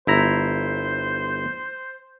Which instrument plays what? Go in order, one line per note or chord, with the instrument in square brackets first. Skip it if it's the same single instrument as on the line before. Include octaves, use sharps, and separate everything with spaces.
[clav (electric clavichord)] G1 E4 A#5 [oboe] C5